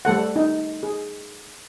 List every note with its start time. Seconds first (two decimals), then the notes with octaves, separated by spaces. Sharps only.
0.05 G3 A3 A4 F#5
0.36 D#4
0.83 G#4